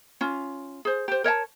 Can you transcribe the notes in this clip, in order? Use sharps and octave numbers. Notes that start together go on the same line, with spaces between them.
C#4 F4
G#4 C5
G4 C5
A#4 C#5 D#5 A5